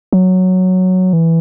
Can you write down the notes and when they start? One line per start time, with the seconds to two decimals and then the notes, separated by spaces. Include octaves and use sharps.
0.13 F#3
1.13 E3